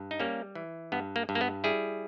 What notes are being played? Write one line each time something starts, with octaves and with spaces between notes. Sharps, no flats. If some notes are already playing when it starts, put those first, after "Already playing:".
Already playing: G2
D#4
G3 A#3 C#4
E3
G2 B3
A#3
G2
A#3
B3
G3 E4 G#4